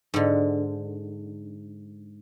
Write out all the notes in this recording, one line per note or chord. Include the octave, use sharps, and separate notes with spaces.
G#2 D3